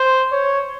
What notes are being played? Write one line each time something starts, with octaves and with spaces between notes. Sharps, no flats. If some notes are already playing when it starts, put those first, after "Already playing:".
Already playing: C5
C#5